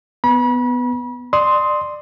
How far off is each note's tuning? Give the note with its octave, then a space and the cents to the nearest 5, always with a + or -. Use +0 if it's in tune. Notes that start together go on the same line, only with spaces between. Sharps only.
B3 +10 B5 -35
D5 +25 C6 +0 D#6 +20